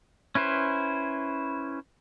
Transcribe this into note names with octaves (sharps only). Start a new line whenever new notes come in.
C#4 E4 B4 C5